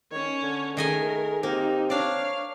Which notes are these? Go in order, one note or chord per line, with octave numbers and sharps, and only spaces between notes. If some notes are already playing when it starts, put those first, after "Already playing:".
D#3 C#4 C#5
D3
D#3 A3 G#4 A#4 D#5 G#5
A#3 C4 D#4 G4
D4 C#5 D5 F5